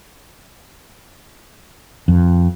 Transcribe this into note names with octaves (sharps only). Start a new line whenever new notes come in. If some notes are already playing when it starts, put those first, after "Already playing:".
F2